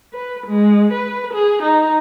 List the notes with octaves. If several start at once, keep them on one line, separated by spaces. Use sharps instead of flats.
B4
G#3
B4
G#4
D#4